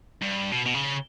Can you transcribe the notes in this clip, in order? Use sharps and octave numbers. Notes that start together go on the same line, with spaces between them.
G2
B2
B2
C#3